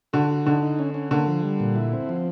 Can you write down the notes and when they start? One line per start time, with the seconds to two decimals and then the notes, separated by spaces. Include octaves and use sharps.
0.13 D3 F#4
0.30 F#4
0.46 D3 D#4
0.62 D#4
0.79 C#4
0.94 C#4
1.11 D3 A#3
1.27 F3
1.43 G3
1.60 A#2
1.76 E4
1.93 C4
2.09 F3